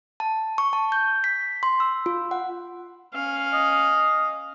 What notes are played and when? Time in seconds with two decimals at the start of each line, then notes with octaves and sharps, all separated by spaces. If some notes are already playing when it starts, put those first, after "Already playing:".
0.20 A5
0.58 C#6
0.73 A5
0.92 G6
1.24 B6
1.63 C6
1.80 E6
2.06 F4
2.31 F#5
3.14 C#4 F5
3.53 D#5